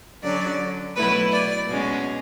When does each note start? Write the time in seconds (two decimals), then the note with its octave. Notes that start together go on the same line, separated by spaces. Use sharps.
0.23 D3 F#3 C#4 D5
0.95 B2 F#3 A3 E4 B4
1.32 D5
1.68 B2 G#3 C#4